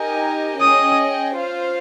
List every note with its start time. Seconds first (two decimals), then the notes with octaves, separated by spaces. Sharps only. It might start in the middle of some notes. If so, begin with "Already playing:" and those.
Already playing: D#4 G4 A#4 D#5 G#5
0.60 C#4 G#4 D#5 G5 D#6
1.35 F4 C5 F5